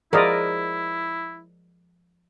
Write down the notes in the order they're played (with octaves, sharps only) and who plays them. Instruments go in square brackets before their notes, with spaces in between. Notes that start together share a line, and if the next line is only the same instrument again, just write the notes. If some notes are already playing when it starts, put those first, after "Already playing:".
[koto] F3 G#3 F#4 [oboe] E4 [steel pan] A#4 D5 D#5